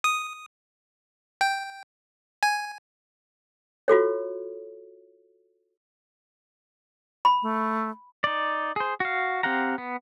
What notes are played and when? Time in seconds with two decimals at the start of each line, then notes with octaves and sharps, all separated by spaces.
0.04 D#6
1.41 G5
2.43 G#5
3.88 F4 F#4 A4 C#5
7.25 B5
7.42 A3
8.24 D#4 D5
8.76 G#4 C5
9.00 F#4 F5
9.43 C4 G4 F5 F#5 A#5
9.78 B3